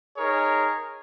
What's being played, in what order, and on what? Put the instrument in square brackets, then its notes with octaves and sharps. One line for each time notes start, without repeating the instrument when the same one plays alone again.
[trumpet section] D#4 G#4 A#4 C#5